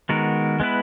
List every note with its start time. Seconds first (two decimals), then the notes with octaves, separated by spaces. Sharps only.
0.09 D#3 G#3 B3 F#4 A#4
0.60 G#3 B3 E4 B4